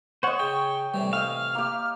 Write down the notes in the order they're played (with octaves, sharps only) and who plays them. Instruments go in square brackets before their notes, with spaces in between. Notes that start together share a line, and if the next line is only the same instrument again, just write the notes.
[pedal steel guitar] C5 F#5 [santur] C#5 D#5 [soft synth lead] C#6
[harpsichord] C#3 [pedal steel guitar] G5
[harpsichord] A2 C3 E3 [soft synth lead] G3
[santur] D#5 G5 E6 [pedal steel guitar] F5 [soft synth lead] F6
[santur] A#3 G4